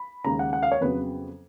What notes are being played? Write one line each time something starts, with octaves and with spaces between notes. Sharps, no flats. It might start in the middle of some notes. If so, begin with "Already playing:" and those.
Already playing: B5
D#2 C#3 G#3 A#5
F#5
F#5
F5
C#5
F2 C#3 F#3 B3 B4